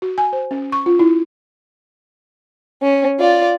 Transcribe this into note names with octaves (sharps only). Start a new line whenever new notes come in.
F#4
G#5
C5
C#4
C#6
F4
E4
C#4
F4 D5